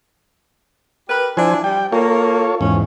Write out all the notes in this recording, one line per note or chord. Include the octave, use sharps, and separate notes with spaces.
G4 A#4 B4
F3 D4 E4 C5 G#5
G3 G5
A#3 F4 A4 C#5
E2 G#2 F3 C#4